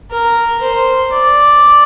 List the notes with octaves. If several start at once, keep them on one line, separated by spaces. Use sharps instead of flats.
A#4
C5
D5